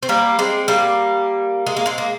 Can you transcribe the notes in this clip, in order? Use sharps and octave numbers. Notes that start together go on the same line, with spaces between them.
C4
G3 A#3
G#3 C4
G3 A#3
G#3
A#3
G#3 C4
A#3